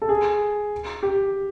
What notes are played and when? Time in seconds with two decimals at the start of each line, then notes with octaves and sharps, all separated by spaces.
0.02 A4
0.09 G#4
1.03 G4